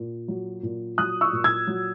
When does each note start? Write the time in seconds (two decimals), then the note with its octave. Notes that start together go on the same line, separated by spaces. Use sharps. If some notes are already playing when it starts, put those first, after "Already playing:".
Already playing: A#2
0.28 F#3
0.63 A#2
0.98 F#3 D#6 F#6
1.21 C#6 E6
1.33 A#2
1.44 E6 G#6
1.67 F#3